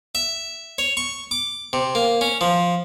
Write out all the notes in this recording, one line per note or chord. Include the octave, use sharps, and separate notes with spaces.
E5
C#5
C#6
D6
C3
A#3
C#4
F3